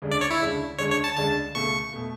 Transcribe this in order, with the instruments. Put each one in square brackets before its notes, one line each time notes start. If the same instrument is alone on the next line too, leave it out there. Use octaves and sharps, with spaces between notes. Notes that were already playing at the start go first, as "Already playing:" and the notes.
[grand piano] D2 C#3 G#3 D4
[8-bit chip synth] D5
C#5
E4
[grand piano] D2 C#3 G#3 D4
[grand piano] D2 C#3 G#3 D4 [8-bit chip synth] C#5
[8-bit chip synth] C#5
A5
[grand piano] D2 C#3 G#3 D4 [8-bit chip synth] A5
[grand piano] C#2 B2 A3 [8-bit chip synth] C#6
[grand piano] B2 A3